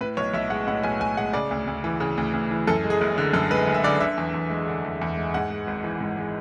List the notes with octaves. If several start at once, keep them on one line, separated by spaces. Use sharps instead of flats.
A2 B4
B1 C#5
B1 E5
G#3 F#5
A2 F#5
B1 G#5
B1 G#5
G#3 F#5
C#3 D5
D2
D2
E3
C#3
D2
D2
E3
F#2 A4
G#3
G#4
F#1
D3
F#2 A4
G#3 B4
F#1
E5
D3 D5
D3 E5
E2
E2
G#3
D3
E2
E2
G#3
G#2 F#5
G#3
G#1
E3
G#2
G#3